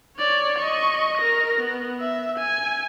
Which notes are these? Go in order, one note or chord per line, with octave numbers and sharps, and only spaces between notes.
C#5 D5
D#5 C#6
A#4 A#6
B3
E5
G#5